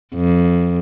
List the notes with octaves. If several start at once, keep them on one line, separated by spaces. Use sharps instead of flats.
F2